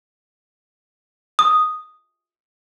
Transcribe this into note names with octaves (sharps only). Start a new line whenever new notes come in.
D#6